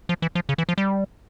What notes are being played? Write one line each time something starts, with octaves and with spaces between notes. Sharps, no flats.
F3
E3
F3
C#3
E3
F3
G3